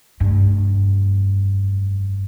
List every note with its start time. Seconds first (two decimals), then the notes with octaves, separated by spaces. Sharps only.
0.20 F1 G2